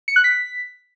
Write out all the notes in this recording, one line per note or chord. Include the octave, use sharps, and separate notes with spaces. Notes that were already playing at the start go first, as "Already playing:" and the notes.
C#7
F#6
B6